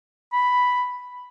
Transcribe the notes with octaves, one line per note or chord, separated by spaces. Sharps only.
B5